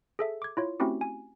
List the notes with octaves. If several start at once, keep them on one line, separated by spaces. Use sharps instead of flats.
G#4 A4 E5
D6 G#6
E4 F4 C#5
A3 C4 C#4 E4 F#4 G4
G#5